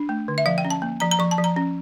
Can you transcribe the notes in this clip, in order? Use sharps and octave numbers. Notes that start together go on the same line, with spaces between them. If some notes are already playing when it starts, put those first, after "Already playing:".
Already playing: D4
A3
D3
E5
F3 F5
G5
C#4
A5
A#3
F3 A#5
A#5
F3 C#6
A5
F3
A#5
C#4